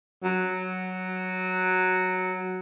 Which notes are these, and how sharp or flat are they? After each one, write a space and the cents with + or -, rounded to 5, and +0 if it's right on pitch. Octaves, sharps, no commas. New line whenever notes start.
F#3 +0